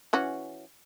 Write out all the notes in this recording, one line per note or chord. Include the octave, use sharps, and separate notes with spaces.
E3 C#4 F#4